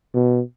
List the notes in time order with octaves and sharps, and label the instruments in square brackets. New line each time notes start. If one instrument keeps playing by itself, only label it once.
[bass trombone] B2